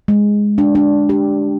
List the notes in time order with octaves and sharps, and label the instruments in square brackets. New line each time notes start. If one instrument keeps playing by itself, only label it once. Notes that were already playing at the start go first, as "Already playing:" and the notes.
[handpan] G#3
D4
D4
G4